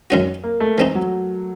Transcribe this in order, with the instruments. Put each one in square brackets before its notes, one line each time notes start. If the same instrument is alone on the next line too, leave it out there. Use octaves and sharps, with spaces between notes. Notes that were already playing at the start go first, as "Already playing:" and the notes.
[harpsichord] F#2 D#3 G#3 C#4 F#4
[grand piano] A#3
A3
[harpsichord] E3 G#3 C4 D#4
[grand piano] F#3